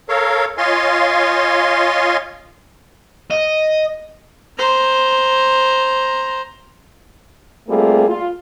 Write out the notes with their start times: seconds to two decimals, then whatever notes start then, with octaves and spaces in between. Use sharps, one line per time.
0.09 A4 A#4 C#5 F5
0.58 F4 C#5 D#5 F5 G#5 C6
3.30 D#5
4.59 C5 A#5
7.68 G3 A3 A#3 C4 F4 G#4
8.08 F4